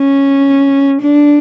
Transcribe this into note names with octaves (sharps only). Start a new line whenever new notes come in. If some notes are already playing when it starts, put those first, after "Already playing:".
Already playing: C#4
D4